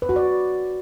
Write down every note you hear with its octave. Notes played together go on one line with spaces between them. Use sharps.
B4
F#4
D5